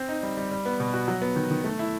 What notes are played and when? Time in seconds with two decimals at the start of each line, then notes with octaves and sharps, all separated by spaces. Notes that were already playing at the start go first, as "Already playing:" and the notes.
Already playing: C4
0.09 D#4
0.23 G3
0.37 G3
0.51 G3
0.65 B3
0.80 B2
0.94 F#4
1.08 F#3
1.22 B3
1.36 D#3
1.51 D#3
1.64 A3
1.79 E4